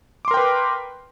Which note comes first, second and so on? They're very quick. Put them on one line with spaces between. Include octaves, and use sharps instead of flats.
D6 C6 A#4 G5 B4